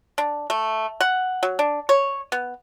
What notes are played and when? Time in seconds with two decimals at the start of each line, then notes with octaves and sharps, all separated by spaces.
0.18 D4
0.50 A3
1.01 F#5
1.43 F#3
1.59 D4
1.89 C#5
2.32 B3